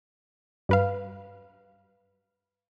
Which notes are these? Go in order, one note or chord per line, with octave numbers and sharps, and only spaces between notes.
G2 B4 F5